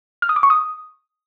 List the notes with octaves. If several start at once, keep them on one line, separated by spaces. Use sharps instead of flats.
F6
D#6
D6
C#6
D#6